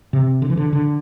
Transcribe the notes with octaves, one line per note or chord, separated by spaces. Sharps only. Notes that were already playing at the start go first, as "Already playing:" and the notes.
C3
D3
E3
D3
D3